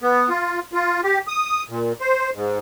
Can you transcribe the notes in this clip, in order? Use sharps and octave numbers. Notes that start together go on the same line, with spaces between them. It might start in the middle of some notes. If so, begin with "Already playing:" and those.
B3
F4
F4
G4
D#6
A#2
C5
G#2